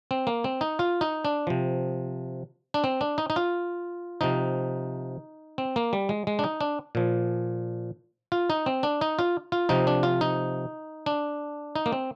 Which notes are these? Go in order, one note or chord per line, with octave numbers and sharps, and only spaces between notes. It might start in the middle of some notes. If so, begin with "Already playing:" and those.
C4
A#3
C4
D#4
F4
D#4
D4
C3 F3
D4
C4
D4
D#4
D#4
F4
C3 F3 D#4
C4
A#3
G3
G#3
G#3
D4
D#4
D4
A#2 F3
F4
D#4
C4
D4
D#4
F4
F4
C3 F3 D#4
D4
F4
D#4
D4
D#4
A#3
C4